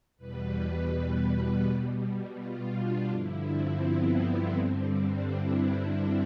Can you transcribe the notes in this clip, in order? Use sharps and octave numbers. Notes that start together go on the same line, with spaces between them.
E2 B2 G3 B4
B2 G3
F4
D4
G2 D3 F3 E4
C4
B3
G2 D3 G3 C4
D4
E4
D4